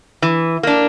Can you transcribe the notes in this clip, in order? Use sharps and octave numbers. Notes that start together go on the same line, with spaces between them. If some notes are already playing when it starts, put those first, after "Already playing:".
E3
A#3 D4